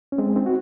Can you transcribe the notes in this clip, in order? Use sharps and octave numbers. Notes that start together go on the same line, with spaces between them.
C#4
G#3 C4
C4 D#4
F#4